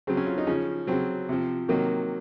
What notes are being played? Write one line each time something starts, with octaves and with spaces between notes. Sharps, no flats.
C#3 F#3 C4
C#4
F4
D#4
C#3 F3 C#4
C#3 F#3 C4
C3 F3
C3 D#3 F#3 A#3